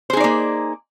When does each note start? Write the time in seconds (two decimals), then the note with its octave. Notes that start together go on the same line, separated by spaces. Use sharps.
0.10 C5
0.13 G#4
0.17 D#4
0.20 D5
0.24 A#3